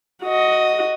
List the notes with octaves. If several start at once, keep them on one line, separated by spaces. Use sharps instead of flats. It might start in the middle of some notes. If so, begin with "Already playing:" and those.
F#4 D#5